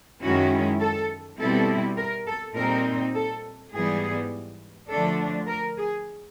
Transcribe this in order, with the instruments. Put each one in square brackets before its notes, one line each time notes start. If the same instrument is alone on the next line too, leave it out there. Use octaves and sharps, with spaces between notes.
[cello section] F#2 D#3 G#3 C#4 E4 F#4
A4
B2 G3 C4 E4 A4
A#4
A4
A#2 G3 C4 D#4 A#4
A4
G#2 E3 G3 B3 G#4
D3 F3 A3 D4 A4
A#4
G#4